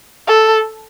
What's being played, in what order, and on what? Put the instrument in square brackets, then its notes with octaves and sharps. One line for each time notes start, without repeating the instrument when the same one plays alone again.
[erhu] A4